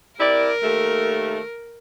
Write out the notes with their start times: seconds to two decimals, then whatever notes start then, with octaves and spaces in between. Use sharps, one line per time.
0.20 C3 E4 A#4 D5
0.63 D#2 A3